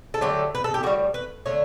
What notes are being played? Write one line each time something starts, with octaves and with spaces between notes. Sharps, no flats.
A4
D3 F#3 A3 G4
B4
A4
G4
A2 G3 F#4
B4
D3 A3 C#5